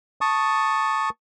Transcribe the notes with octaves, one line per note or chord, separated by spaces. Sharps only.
A5 C#6 D#6